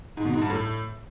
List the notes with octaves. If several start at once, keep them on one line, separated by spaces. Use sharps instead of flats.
G#2
B2
G#2
G2
A2